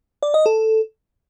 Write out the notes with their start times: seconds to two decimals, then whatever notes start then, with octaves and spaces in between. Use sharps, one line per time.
0.23 D5
0.34 D#5
0.46 A4